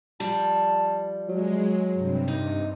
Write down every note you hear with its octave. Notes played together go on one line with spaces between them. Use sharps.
F3 G3 A5
F#3 G#3
G2 C3
D#4